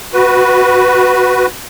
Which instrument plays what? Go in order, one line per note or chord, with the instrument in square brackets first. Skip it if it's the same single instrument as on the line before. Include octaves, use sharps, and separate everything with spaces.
[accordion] F#4 B4